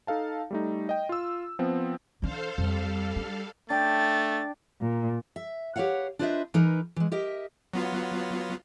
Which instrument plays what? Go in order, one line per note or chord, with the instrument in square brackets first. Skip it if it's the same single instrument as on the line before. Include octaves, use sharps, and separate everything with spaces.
[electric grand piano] D#4 A4 F5 A5
G3 A3 D#4
D#5 G5
F4 E6
F3 B3 C4
[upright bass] E3 D4 [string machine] A4 C5 F5
[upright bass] F2 [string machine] G3 A4 F5
[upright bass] D4
[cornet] A3 [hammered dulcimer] D4 [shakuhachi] G5 [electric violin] A6
[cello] A#2
[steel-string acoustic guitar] E5
G4 B4 C#5 F5 F#5
D4 F4 B4 C5 D#5 E5
E3 D#4 A#4 B4
E3 G#3
G4 A#4 D#5 E5
[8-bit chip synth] F#3 B3 F4